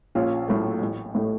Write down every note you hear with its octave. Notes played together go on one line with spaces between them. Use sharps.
A#1 C#4 F4
A2 F#3 A3
A1
A2 A3